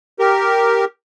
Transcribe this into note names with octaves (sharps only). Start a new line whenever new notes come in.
G4 A#4